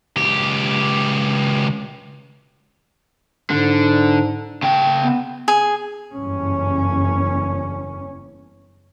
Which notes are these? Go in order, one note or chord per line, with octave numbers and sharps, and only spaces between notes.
C#2 G4
G#2 D3
C#3 G5
B3
G#4
F#1 E2 G2 C#4